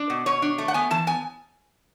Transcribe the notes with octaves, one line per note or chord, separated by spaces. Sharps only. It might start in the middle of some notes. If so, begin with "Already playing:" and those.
Already playing: D4 D5
B2
B2 C#5
D4
A3
F#5
B3 G#5
E3 A5
B3 G#5